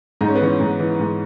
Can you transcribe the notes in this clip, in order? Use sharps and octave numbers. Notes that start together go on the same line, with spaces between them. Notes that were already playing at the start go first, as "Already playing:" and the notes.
G#2 D#4
C#4
B3
E3 C#4
G#2
E3
G#2